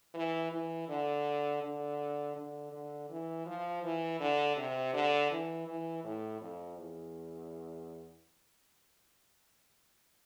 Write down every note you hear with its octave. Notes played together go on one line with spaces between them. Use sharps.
E3
E3
D3
D3
D3
D3
E3
F3
E3
D3
C3
D3
E3
E3
A2
F2
E2